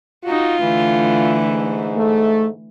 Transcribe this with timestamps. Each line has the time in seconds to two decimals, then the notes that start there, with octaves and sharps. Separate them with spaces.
0.24 D#4 F4 F#4
0.62 D3 E3 A3
1.48 G#2
1.97 A3